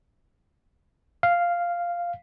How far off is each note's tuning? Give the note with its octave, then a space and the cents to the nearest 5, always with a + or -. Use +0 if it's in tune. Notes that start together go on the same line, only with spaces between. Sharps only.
F5 -5